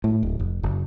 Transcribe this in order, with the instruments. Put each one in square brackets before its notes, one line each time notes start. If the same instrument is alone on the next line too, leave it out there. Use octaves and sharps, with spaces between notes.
[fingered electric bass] A2
D1
F1
F#1